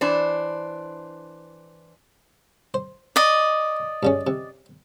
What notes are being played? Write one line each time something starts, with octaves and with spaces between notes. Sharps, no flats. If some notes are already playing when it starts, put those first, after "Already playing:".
E3 D4 C5
C5
D5 D#5
G2 C#3 C#4
C3